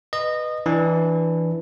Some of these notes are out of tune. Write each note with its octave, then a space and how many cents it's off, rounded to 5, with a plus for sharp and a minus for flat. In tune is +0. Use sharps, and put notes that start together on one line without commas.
B4 +0 D#5 -20
E3 +0 D4 +0